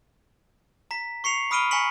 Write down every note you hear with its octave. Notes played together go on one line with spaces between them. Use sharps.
A#5 B6
C#6 C7 C#7 F7
B5 D#6 F6 D7 D#7 G7
G#5 A#5 C#6 B6 C#7 F#7